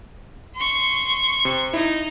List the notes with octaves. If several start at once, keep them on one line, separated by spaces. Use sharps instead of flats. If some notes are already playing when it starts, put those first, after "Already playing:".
C6 C#6
C3
D#4 E4